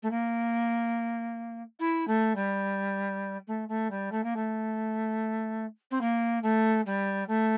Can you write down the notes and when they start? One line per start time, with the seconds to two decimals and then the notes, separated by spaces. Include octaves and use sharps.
0.02 A3
0.10 A#3
1.79 E4
2.07 A3
2.35 G3
3.47 A3
3.68 A3
3.90 G3
4.11 A3
4.23 A#3
4.36 A3
5.91 C4
6.01 A#3
6.43 A3
6.85 G3
7.28 A3